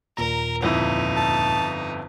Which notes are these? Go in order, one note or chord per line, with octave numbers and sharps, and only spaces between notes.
D#2 A#2 A#4 A#5
G1 F2 D#4 E4
A5